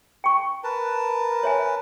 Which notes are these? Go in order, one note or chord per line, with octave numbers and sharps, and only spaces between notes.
G5 C#6
A#4 B4 A5
C#5 E5 G#5